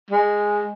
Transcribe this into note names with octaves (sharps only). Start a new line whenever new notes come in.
G#3